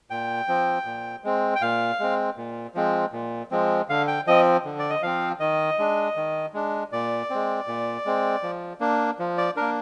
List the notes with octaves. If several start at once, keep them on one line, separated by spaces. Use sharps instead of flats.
A#2 G5
F3 C4
A#2
G#3 C4
G5
A#2 F5
G#3 C4
A#2
F3 G#3 C4
A#2
F3 G#3 C4
D3 F5
G5
F3 C4 D#5
D3
D5
D#5
F3 C4 F5
D#3 D#5
G#3 D4
D#3
G#3 D4
A#2 D5
G#3 C4
A#2
G#3 C4
F3
A#3 D4
F3
D5
A#3 D4 A#4